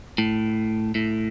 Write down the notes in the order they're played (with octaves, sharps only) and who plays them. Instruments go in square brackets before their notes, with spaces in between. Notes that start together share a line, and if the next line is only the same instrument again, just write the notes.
[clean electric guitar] A2
A2